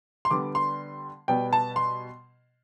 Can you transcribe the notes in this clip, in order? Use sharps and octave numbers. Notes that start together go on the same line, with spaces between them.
C6
D3 G3 B3 D6
C6
B2 G3 B3 G5
A5
C6